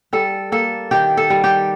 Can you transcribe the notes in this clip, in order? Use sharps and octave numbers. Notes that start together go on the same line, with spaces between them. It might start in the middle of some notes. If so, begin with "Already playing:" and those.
G3 A4
A#3 A4
D#3 G4
A4
G3
G4